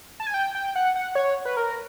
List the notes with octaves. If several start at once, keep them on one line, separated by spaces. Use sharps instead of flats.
A5
G#5
G5
G5
F#5
F#5
C#5
B4
A#4